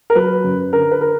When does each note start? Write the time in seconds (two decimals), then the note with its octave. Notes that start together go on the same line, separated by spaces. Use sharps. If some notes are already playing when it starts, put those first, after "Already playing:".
0.10 A#4
0.15 F#3 B4
0.44 F#2
0.73 D3 A#4
0.91 B4
1.01 A#4